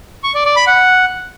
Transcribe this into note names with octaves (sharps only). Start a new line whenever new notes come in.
C#6
D5
D5
B5
F#5